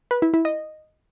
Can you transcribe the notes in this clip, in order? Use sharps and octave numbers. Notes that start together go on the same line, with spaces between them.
B4
E4
E4
D#5